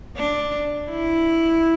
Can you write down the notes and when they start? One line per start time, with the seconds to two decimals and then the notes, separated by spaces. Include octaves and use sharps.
0.17 D4
0.90 E4